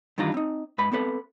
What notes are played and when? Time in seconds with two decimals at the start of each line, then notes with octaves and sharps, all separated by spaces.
0.18 G2 D#3 E3 D4 F4 A#5
0.34 C4 D#4
0.78 G#2 B4 B5
0.92 B3 C4 A4 B4